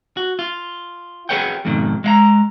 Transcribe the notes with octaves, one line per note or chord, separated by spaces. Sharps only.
F#4
F4
G#4 A#4 B4 C#5 F#5 G5
F2 G#2 B2 D#3
G#3 F5 A#5